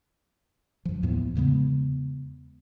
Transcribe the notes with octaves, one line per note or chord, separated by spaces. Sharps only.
F#2 F3
D#2 A2 F3 B3
E2 C#3 G#3 B3